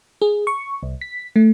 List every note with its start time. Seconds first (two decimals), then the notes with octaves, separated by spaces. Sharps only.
0.22 G#4
0.47 C#6
0.83 C2
1.01 B6
1.36 A3